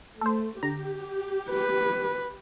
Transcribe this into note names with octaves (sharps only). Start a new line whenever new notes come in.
A3 A4 C5
D3 G4 A#5
B4